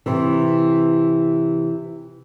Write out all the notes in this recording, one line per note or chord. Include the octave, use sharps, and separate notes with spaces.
C3 E3